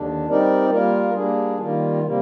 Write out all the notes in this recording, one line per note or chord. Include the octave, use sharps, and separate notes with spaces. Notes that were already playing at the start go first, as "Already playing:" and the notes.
Already playing: D#2 D3 D4
G3 C4 D#4 A#4 D5
G3 A#3 F4 A#4
G3 A#3 D4 G#4
D#3 G3 A#3 F4
C3 G3 A#3